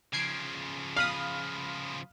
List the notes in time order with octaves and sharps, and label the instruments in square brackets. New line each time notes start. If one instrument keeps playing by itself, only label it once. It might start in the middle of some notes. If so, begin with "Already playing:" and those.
[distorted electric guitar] C#3 F3 [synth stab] G#6 C7 D7
[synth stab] F5 B5 D#6 [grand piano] F6